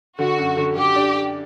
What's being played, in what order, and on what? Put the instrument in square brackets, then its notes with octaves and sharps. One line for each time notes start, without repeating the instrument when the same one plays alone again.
[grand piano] D3 [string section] F#4
[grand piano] F#2
D3
[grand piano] D3 [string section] G4
[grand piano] D4